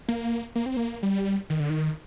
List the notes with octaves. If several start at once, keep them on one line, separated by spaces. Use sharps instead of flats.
A#3
A#3
C4
A#3
G3
D#3
D3
D#3